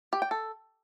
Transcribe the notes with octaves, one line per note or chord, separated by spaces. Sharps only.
G4
G5
A4